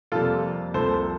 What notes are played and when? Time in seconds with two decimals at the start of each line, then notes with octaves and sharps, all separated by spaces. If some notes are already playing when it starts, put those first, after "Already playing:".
0.12 F2 C3 G3 A#3 F4 A4
0.74 C2 C3 F3 A#3 A4 C5